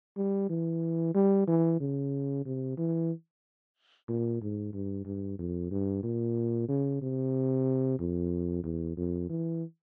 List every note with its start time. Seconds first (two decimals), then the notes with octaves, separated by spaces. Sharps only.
0.17 G3
0.50 E3
1.15 G3
1.48 E3
1.80 C#3
2.46 C3
2.78 E3
4.09 A#2
4.41 G#2
4.73 G2
5.05 G2
5.39 F2
5.71 G2
6.03 A#2
6.69 C#3
7.02 C3
8.00 F2
8.64 E2
8.97 F2
9.30 E3